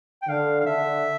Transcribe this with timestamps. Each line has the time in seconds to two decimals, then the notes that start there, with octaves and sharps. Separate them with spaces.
0.22 G5
0.28 D3 F5
0.61 F5
0.66 D3 E5